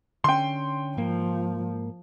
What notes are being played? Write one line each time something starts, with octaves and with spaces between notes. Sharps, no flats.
D3 C#4 G5 C6
G#2 F3 A#3